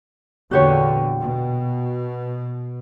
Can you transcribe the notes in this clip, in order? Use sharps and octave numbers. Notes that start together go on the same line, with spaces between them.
E2 A#2 D3 F#4 G4 C#5
B2